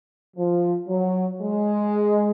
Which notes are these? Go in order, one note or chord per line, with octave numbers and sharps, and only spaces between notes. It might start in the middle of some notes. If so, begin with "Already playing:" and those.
F3
F#3
G#3